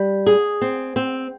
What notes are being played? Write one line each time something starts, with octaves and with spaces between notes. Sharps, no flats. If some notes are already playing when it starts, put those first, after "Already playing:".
Already playing: G3
G#4
C4
C4